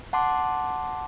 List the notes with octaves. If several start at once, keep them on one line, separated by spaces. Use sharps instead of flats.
F#5 A5 C6 D6